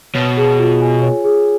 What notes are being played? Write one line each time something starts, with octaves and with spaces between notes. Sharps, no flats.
B2 C#5
G#4
F4
G#5
C#5
G#4